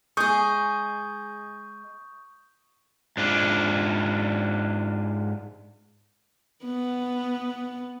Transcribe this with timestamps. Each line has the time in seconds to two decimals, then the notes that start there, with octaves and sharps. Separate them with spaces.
0.17 G#3 G#4 C#6 D#6 G6
3.17 G#2 D4 F4
6.64 B3